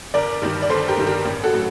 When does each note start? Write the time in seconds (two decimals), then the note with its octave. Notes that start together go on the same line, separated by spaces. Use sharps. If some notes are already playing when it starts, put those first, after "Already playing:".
0.14 G1 A#4 D5
0.42 G2 D#3 G3
0.62 D5
0.69 G1 A4 C5
0.88 G4 A#4
0.97 G2 D#3 G3
1.07 G4 A#4
1.25 A1
1.44 F#4 A4
1.53 A2 F#3